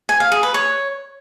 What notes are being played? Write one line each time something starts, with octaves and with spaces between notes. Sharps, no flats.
G#5
F5
G#4
B4
C#5